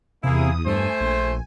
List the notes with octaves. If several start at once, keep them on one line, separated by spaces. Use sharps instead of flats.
E2 C3 A#3 E4 G#4 D#6
G2 A3 C5 G#5
A#1